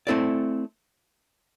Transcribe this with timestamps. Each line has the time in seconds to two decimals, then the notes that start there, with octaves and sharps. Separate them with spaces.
0.07 A3 C4 E4 A4 D5